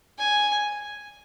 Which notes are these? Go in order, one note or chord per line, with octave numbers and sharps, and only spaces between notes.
G#5